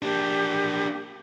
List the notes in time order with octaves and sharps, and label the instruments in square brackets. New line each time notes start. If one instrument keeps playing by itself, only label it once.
[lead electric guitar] A#3 D4 [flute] G4